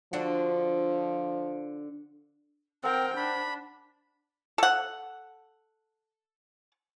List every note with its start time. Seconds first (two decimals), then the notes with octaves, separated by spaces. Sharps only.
0.13 D3 F3 D4 F#4
2.84 C4 A#4 C5 F#5 G5
3.17 D4 B5
4.58 A4 F#5